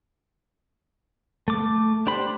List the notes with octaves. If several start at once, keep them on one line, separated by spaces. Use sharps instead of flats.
A3 D6
D4 G4 C5 B5